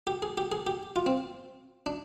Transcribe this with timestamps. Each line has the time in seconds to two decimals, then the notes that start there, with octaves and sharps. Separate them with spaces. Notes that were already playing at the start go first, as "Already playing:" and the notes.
0.07 G4
0.22 G#4
0.38 G4
0.52 G#4
0.67 G4
0.96 F4
1.06 C4
1.86 D4